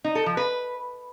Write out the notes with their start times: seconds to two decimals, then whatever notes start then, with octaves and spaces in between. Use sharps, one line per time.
0.04 D#4
0.15 A4
0.26 F3
0.37 B4